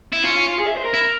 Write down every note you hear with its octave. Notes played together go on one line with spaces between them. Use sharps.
E4
C#4 F4
F4
F4
G#4
E5
C5
A#4
E4